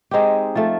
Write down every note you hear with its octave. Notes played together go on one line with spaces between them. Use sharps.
G#3 C4 D#4 G4
F3 A3